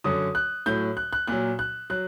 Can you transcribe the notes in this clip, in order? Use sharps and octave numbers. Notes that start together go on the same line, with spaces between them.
F#2 D3 F#3 D#6
F#6
A2 F#3 G6
F#6
F#6
A#2 F#3 F#6
F#6
F#3 F#6